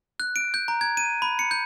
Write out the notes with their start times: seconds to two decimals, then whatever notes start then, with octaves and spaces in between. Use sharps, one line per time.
0.20 F#6
0.36 D7
0.54 G6
0.68 A#5
0.81 G#6
0.97 D#7
1.22 B5
1.39 C#7
1.51 G6